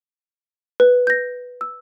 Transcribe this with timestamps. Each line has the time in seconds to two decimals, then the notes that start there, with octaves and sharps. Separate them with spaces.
0.80 B4
1.07 G6 A#6
1.61 E6